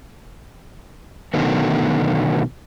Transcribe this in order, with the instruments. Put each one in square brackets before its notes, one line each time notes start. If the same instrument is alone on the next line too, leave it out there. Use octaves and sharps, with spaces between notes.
[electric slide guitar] B2 D3 D#3 F#3 A3 B3